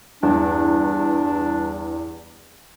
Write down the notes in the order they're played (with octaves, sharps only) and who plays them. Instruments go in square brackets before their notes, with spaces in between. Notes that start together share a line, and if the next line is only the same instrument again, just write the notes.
[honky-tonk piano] E2 G2 [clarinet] D4